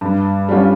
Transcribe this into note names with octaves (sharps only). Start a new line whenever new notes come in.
G2
G3 C#4 F4